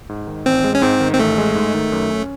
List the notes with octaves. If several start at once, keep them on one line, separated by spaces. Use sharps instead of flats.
G#2
D#3
A1 C4
G#3
C#4
G#2 C4
D#3
C4
A1 A3
G#3
G#2
D#3
F#2
C#4